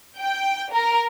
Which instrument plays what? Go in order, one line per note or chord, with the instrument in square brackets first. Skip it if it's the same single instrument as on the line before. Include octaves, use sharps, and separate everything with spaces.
[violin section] G5
A#4